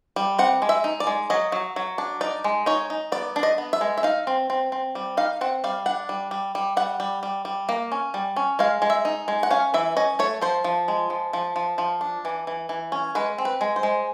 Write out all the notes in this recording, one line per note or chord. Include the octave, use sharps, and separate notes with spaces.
G3
C4 F#5
G#3
E5
D#4
D5
G#3
F#3 D#5
F#3
F#3
D4
D#4 D5
G#3
D#4 C#5
D#4
B3 D5
D4
D#5
B3
E5
G#3
E5
D#4 F5
C4
C4
C4
G3
D#4 F5
C4 F#5
G3 F5
D4 F#5
G3
G3
G3
G3 F#5
G3
G3
G3
A#3
C#4
G3
C#4
G#3 F5
G#3
E5
D#4
G#3
F#5
C#4 F5
E3 E5
C#4 D#5
A3 C#5
F3 C5
F3
G#3
F3
F3
F3
F3
D4
E3
E3
E3
C#4
G#3 B4
C4
B4
G#3
C5
G#3